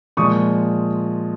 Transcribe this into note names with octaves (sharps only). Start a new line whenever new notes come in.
A#2 F3 G#3 C#6 D#6